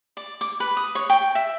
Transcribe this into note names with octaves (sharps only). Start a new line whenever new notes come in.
D5
D6
B4
D#6
C#5
G5
E5